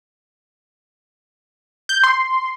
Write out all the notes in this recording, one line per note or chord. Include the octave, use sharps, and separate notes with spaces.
G6
C6